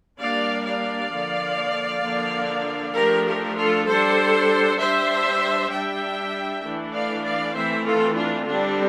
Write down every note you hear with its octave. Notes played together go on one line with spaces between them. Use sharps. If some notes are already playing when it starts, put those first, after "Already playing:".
G3 A#3 D4 D5 F5
D5 F5
D3 F3 A#3
D3 F3 A#3 D4
F3 A3 D4 G4 A#4
G4 A#4
F4 A4
G3 D4 A4 C5
G3 D4 C5 E5
G3 D4 E5 G5
E3 A3 D4
D5 F5
D5 F5
E3 A3 C4 C5 E5
F4 A4
D4 F4
D3 G3 C4 D4